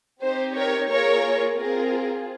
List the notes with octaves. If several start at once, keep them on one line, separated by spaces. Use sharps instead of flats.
C4 D#4 G4 C5
A#4 C#5
A#3 F4 G#4 A#4 C#5
C4 F4 G#4 A#4